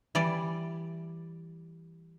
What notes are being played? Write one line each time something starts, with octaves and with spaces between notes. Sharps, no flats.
E3 G3 D5